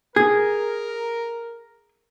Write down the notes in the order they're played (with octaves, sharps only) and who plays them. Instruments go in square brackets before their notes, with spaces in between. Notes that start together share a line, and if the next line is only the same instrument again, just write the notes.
[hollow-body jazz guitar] G#4 [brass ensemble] A#4